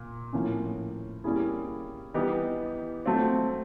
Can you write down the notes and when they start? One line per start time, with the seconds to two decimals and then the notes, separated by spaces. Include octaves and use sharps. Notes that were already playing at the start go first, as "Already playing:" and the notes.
Already playing: A#2
0.33 A2 F3 A#3 C#4
1.24 G3 A#3 C#4 E4 G#4
2.14 E3 G3 B3 D#4 G4
3.06 F#3 A3 C4 F4